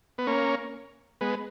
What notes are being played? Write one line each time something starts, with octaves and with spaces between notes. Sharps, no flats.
B3
A#3 C#4
G#3 B3